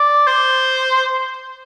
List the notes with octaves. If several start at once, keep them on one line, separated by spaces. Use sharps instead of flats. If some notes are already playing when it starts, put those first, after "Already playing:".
Already playing: D5
C5